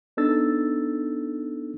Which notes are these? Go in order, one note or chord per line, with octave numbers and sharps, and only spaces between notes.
B3 D4 D#4 A4 E6 A6